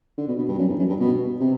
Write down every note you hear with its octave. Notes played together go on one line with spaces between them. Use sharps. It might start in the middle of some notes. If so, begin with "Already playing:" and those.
D3
B2
B2
G2
F#2
E2
F#2
G2
B2
C3